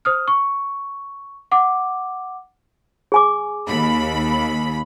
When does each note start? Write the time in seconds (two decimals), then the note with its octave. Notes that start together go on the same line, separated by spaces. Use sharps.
0.05 C5 D#6 F6
0.28 C#6
1.52 F#5 D6
3.12 G#4 G#5 D6
3.66 D#2 B5